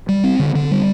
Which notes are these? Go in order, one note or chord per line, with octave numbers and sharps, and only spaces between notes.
G3
C4
D3
D3
G3